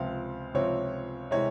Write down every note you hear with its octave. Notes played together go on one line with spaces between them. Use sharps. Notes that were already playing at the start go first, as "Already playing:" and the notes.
Already playing: C#2 C3 F3 C4 F5
C#2 C3 F3 C4 C#5
C3 E3 G#3 C#5